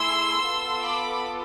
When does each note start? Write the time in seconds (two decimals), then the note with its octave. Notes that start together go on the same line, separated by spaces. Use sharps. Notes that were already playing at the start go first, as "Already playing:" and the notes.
Already playing: A3 E4 G#4 C6 E6
0.44 B3 F4 A4
0.83 B5 D6